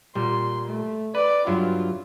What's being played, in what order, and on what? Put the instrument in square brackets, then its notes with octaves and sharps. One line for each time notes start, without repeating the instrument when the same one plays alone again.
[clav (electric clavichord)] A#2 G3 [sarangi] C6
[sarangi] A3
[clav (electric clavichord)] B4 [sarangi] D5
[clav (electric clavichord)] G2 F#3 E4 [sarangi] F4